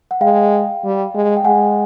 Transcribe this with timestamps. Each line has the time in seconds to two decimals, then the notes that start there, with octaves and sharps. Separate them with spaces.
0.11 F#5
0.21 G#3 F5 G5
0.84 G3
1.14 G#3
1.37 G5
1.45 G#3 F#5 G#5